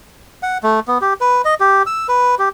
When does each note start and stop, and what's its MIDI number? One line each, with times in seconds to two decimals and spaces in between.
0.43 0.58 78
0.63 0.80 57
0.88 0.98 59
1.01 1.14 67
1.21 1.42 71
1.45 1.54 75
1.60 1.83 67
1.86 2.07 88
2.08 2.35 71
2.39 2.49 67